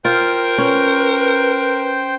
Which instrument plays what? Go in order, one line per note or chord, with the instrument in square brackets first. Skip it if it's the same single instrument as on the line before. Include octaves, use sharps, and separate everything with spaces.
[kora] F4 [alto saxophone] A#4 [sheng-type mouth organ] C5 G5
[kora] C#4 [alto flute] B4